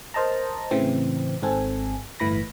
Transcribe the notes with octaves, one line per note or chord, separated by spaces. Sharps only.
A#4 C5 D#5 A5 A#5
A2 C#3 E3 C4
G#1 G#2 C4 A4 G#5
G1 A2 E3 B5 A#6